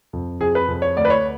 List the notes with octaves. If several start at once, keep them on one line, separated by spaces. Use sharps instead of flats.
F2
F2 G#4
B4
F2
C#5
D2 D5
B4
C#5